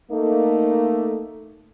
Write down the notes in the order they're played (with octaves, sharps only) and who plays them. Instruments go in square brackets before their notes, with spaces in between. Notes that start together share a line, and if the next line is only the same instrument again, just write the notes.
[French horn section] A3 A#3 D#4